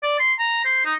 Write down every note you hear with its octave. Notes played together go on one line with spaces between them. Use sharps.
D5
C6
A#5
C5
D#4